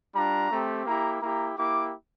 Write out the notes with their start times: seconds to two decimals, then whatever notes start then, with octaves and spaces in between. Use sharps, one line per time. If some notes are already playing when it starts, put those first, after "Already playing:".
0.15 G3 D4 F4 A#5
0.50 A3 C4 G4
0.86 A#3 E4 G4 A#5
1.22 A#3 E4 G4 A#5
1.57 A#3 E4 G4 D6